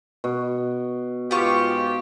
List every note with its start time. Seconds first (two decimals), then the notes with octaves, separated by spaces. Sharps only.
0.24 B2
1.31 G#2 B3 F4 G4 C#6